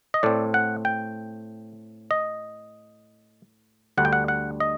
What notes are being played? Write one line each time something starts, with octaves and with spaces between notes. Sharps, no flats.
D#5
A2 A3 C4 D5
F#5
G5
D#5
D2 D3 G3 F#5
G5
F#5
F#5
D#5